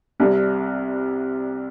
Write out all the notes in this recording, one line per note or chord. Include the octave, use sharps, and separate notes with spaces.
C2 C3 G3